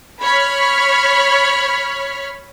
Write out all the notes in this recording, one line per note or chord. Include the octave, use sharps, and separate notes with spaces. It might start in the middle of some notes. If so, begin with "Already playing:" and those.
C#5 B5 F6